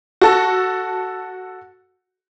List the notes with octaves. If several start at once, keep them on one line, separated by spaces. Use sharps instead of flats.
F#4 A4